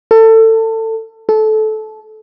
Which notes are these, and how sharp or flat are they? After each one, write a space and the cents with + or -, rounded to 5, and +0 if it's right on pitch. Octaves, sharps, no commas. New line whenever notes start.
A4 +25
A4 -20